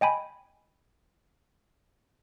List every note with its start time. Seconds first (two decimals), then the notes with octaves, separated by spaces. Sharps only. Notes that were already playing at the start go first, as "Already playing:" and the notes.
0.01 D#5 G5 G#5 B5